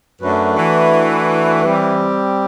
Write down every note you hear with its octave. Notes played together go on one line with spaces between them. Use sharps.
F#2 A3 D4 F#4 B4
E3
G3 C4 G4